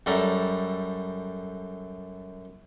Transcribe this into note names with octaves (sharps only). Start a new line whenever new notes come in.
F#2 G3 A4 E5 A#5